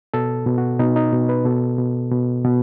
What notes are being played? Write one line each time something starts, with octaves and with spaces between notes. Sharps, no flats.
B2 A4
B2
F#4
B2 D#4
D#4
B2
B4
B2 A4
B2
B2
B2